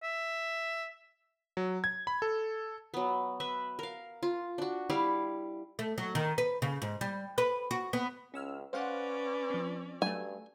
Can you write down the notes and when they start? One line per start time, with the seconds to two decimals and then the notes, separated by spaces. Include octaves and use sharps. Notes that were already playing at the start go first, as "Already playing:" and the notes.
0.03 E5
1.57 F#3
1.84 G#6
2.07 B5
2.22 A4
2.94 F#3 B3
3.40 B4 E5
3.79 A#4 F5
4.23 F4
4.58 D4 F#4
4.90 G3 E4 F5
5.79 A3
5.98 F#3
6.15 D#3
6.38 B4
6.62 C#3
6.82 G#2
7.01 G3
7.38 B4
7.71 F#4
7.93 B3
8.34 C#2 C#4 E6 F6
8.73 C#4 B4 C5 D5 F5 F#5
9.50 F3 C4
10.02 G2 F#3 A3 G#5